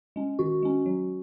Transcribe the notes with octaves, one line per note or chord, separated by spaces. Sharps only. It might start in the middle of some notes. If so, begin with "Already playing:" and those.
G#3 C#4
D#3 F#4
G#3 C#4
F#3